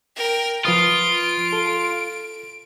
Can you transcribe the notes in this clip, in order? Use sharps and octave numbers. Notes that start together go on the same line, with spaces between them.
A#4 G5
F3 F4 B4 D#6 D7
A4